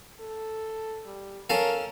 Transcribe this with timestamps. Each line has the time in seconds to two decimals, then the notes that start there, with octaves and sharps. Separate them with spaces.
0.20 A4
1.07 G3
1.50 C#4 A4 A#4 F5